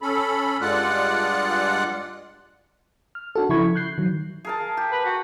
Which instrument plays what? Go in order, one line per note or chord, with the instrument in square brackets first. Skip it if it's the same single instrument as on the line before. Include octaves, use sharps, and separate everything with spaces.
[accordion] C#4 A4 B5
G2 G#3 F4 D5 F#5 F#6
[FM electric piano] F6
D4 F#4 A4
C#3 F3 E4 B5 C#6 G#6
F#6 G6 C7
D#3 F#3
[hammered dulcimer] G#4 A#4 A5
G4
[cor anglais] B4
F#4